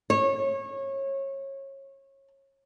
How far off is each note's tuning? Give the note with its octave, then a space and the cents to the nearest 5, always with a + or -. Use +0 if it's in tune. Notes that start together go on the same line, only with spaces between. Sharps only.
C#5 -25